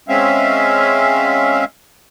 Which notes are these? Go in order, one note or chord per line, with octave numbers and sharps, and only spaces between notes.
G#3 C4 C#4 E5 F5